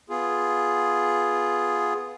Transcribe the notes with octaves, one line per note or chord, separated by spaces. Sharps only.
B3 F4 G#4